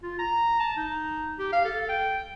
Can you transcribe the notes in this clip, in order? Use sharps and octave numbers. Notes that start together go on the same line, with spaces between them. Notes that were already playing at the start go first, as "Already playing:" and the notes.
F4
A#5
A5
D#4
G4
F5
A4
G5